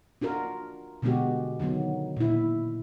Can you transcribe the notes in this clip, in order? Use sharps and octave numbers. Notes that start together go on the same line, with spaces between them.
D4 F4 F#4 A#4
B2 D3 G#3 B3 F#4 G4
D3 D#3 F#3 B3
A#2 E4